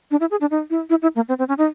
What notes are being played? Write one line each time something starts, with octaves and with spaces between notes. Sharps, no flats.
D4
E4
G#4
D4
D#4
E4
E4
E4
A#3
C4
C4
C#4
D#4